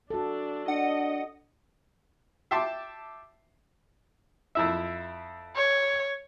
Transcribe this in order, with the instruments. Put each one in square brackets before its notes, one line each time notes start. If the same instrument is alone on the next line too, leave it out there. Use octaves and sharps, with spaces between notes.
[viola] D4 [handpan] F#4 A4
[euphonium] D4 [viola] D#5 [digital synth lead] F#5
[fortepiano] E5 G5 A5 C6 D6
F2 E4 E5
[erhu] C#5